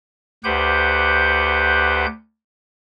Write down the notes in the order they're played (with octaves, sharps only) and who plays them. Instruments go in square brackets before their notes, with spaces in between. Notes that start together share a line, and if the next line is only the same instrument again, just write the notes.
[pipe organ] D2 G4 B4 C5 F#5 G6